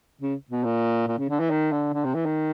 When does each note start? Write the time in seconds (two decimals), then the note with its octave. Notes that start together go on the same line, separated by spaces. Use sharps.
0.21 C#3
0.50 B2
0.64 A#2
1.07 A#2
1.18 C#3
1.29 D3
1.40 E3
1.50 D#3
1.72 D3
1.93 D3
2.04 C3
2.15 E3
2.26 D#3